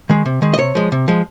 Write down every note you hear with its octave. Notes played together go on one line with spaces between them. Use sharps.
D#3 G#3
C3
D#3 G#3
D#5
C3 C#5
F3 G#3
C3
F3 G#3